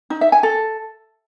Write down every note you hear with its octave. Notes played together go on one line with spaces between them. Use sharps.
D#4
E5
G#5
A4